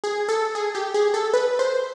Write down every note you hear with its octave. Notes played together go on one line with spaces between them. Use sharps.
G#4
A4
G#4
G4
G#4
A4
B4
C5